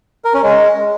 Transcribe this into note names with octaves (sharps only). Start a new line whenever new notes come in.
A#4
C#4
G#3